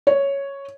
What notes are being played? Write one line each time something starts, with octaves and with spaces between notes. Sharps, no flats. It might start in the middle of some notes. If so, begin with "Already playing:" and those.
C#5